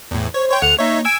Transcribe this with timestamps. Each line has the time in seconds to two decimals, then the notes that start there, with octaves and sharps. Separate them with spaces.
0.11 E2 A2
0.34 C5 C#5
0.50 C#5 G5 C6
0.62 D2 A4 F#5 C#7 F7
0.78 A#3 D#4 C#5 E5
1.05 G#5 E6 G#6 D7